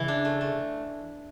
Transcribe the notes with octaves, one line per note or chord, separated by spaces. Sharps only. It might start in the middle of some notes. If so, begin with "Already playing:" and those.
Already playing: C#3 E3 E4
D4
A3
A3